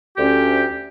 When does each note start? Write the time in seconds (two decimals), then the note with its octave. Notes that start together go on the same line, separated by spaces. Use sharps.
0.18 D2 C#4 G4